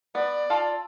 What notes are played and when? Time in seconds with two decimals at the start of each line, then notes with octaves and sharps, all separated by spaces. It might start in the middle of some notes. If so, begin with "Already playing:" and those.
0.15 B3 D5
0.50 F4 A4 F5